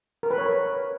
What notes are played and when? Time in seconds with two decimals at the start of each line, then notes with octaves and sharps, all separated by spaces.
0.23 A#4
0.31 B4
0.38 C#5
0.46 A#4